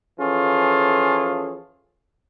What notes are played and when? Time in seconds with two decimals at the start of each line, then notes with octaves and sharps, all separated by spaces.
0.19 E3 F3 C#4 F4 G#4 A4